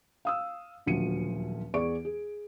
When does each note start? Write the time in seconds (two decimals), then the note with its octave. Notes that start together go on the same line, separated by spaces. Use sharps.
0.25 F5 D#6 E6
0.86 D#1 D2 F3 F#3 C#7 D#7
1.74 E2 G#4 D5 C#6 D7
2.05 G#4